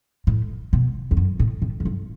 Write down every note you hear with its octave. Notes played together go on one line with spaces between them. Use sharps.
A2
B2
E2
F#2
A2
A2
F#2
G2